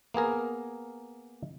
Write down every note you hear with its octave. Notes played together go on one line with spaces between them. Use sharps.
A#3 B3 G#4 A#4